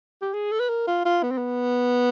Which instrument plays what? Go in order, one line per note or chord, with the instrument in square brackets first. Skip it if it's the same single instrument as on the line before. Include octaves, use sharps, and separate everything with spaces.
[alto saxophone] G4
G#4
A4
B4
A#4
F4
F4
B3
C4
B3